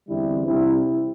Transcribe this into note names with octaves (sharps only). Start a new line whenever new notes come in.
E2 D3 G3 C4 E4
C3 G3 C4 E4